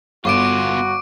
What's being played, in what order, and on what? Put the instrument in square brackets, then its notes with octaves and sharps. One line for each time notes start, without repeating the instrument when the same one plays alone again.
[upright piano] G1 [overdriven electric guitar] B3 F4 [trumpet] F#4 [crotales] C#6 D6 D7